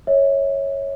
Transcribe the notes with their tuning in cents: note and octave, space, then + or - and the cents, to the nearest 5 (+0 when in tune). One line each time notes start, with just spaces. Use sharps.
C#5 -5 E5 -30